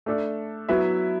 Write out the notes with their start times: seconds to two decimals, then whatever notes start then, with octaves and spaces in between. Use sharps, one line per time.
0.06 A3 D4 A4
0.69 F#3 B3 E4 B4 E5